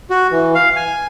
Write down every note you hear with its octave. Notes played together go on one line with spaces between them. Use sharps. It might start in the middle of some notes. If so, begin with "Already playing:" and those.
F#4
E3
F5
G#5